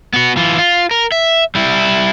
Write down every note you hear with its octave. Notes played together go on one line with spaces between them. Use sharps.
B3 F#4
E3 F4
F4
A#4
E5
G3 E4